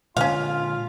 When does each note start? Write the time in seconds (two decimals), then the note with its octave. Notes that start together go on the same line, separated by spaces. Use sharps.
0.17 A#2 D3 G#3 C#4 F4 F5